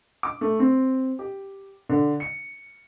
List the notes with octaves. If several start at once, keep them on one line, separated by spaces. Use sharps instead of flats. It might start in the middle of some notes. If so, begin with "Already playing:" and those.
D6
A3
C4
G4
D3
C#7